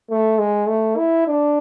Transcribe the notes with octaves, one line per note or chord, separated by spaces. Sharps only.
A3
G#3
A3
E4
D4